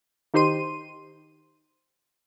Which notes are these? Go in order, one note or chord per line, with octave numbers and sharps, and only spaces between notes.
D#3 D#4 G4 C5 C6 D#7